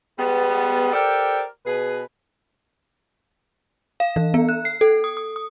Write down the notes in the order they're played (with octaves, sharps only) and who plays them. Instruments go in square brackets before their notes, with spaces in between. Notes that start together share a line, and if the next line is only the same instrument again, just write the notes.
[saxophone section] G3 G#3 B3
G4 A4 A#4 C5 D5
B2 G#4 B4
[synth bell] F5
E3
B3
F#6
C7
A4
D#6
D#6
D#6